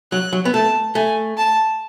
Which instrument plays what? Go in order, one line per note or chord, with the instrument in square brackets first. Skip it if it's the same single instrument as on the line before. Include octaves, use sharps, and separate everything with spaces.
[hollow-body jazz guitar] F#3 [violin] F#6
[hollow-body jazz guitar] F#3
B3
[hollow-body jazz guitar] A3 [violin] A5
[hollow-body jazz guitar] A3 [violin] G#5
[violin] A5